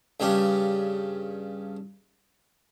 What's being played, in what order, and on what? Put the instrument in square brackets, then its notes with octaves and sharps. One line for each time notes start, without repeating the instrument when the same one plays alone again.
[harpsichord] G2 C#3 D4 G4